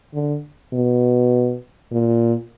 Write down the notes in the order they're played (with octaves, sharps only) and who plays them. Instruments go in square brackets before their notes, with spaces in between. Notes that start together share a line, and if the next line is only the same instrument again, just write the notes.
[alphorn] D3
B2
A#2